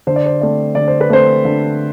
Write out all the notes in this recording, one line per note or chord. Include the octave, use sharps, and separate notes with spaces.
D3 C5
D5
C5
A3 C4 D5
D3 D5
C5
B4
A3 C4 C5
D3